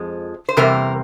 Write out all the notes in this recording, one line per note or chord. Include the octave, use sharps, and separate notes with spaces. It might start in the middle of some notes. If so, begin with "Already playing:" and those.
Already playing: F2 F3 G#3
C5
E2 C3 G3 A#3 A#4